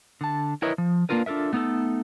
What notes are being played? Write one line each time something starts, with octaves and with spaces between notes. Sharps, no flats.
D3 A5
E4 A#4 B4 C#5 D#5 E5
F3
A#3 B3 D4 F4 A#4 B4
D4 F4 A4 A#4 E5
A3 B3 D#4 G4 A4